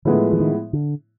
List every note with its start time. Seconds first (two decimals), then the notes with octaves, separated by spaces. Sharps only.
0.05 A2 D3 F3 G#3 B3 E4
0.33 E3
0.40 D#3
0.73 D3